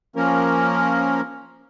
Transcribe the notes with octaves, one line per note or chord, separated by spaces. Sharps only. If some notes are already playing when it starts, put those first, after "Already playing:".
F3 A#3 C#4 A#4